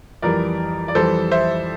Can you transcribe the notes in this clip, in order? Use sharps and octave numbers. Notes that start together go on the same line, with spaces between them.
F2 E3 G3 A#4 D5
D5
F2 E3 G3 A4 C5
C5 E5